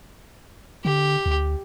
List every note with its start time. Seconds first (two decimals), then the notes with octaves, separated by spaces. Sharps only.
0.85 D3 G4
1.26 D2